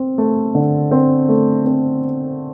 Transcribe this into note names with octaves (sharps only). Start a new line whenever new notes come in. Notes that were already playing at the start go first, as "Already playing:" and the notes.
Already playing: C4
A3
D3
C4
A3
C4